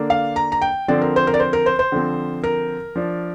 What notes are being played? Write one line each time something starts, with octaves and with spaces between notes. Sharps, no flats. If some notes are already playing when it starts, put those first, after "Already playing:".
Already playing: D3 A#3 D4
F5
A#5
A#5
G5
D3 F3 C4 D5
A#4
C5
A#4
D5
C5
A#4
C5
C5
D3 F3 C4
A#4
F3 D4